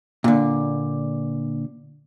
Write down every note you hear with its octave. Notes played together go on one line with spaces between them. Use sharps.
A#2 D3